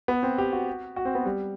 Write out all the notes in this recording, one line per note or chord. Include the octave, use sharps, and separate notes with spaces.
B3
C4
G4
F#4
F#4
C4
B3
G3